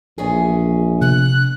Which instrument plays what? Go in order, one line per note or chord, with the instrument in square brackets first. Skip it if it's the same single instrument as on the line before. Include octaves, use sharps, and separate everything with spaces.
[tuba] A#1 [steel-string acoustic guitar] E2 C#4 G#4
[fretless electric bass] C3 B3 D4 [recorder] F#6